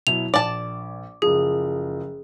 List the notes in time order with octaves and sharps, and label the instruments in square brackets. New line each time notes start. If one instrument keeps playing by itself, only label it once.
[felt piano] B2 F#3 E4 [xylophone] F7
[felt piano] A#1 [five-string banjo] D5 A5
[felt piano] F#1 F3 [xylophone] G#4